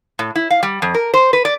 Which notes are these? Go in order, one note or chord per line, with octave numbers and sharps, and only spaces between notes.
A2
E4
F5
G3
F2
A#4
C5
B4
D5